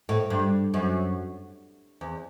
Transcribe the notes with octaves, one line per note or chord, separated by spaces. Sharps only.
A2
G2
F#2
E2